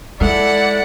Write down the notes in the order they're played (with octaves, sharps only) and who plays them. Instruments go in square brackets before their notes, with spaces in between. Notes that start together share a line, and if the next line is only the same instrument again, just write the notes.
[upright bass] G#3 [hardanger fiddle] E4 [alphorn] A4 [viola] D5 F#5